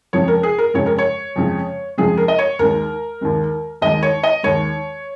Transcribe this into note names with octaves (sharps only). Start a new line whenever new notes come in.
F2 C#3 F3 G#3 C#5
A#4
G#4
A#4
F2 C#3 F3 G#3 C#5
A#4
C#5
F2 C#3 F3 G#3
F2 C#3 F3 G#3 G#4
A#4
D#5
C#5
D#2 D#3 G#3 A#4
D#2 D#3 G#3
D#2 D#3 G#3 D#5
C#5
D#5
D#2 D#3 G#3 C#5